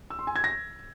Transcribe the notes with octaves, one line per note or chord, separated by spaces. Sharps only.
E6
C6
G#5
G#6
A#6